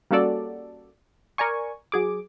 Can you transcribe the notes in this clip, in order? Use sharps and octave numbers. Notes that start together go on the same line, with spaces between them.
G3 A#3 C#4 F#4 A4 D5
A#4 D5 G#5 C#6
F#3 G#4 D6